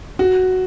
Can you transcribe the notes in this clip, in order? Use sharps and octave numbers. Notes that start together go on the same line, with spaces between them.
F#4